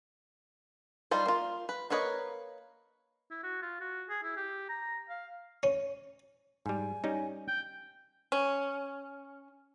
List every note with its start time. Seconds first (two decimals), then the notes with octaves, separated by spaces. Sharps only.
1.11 G3 D#4 F4 C5
1.26 A#3 F4
1.69 B4
1.90 A#3 A#4 B4 C#5 D#5
3.31 E4
3.43 F#4
3.62 F4
3.81 F#4
4.09 G#4
4.23 E4
4.37 G4
4.70 A#5
5.10 F5
5.63 C#4
6.66 G#2 G3 G#5
7.04 G3 C#4 D#4
7.48 G5
8.32 C#4